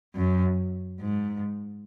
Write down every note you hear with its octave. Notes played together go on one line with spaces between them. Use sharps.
F#2
G#2